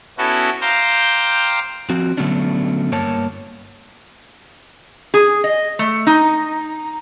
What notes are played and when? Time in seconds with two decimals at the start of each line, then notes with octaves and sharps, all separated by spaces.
0.18 B3 C#4 E4 F#4 A4
0.61 C5 F5 G5 A#5 D6 G6
1.90 F3 C4 F#4
2.17 D3 F#3 A3 B3 C#4 D4
2.92 G2 A#3 C#5 A5
5.14 G#4
5.44 D#5
5.79 A3
6.07 D#4